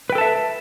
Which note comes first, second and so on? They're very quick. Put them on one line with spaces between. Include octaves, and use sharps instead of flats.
B4 G5 A4 A5 E5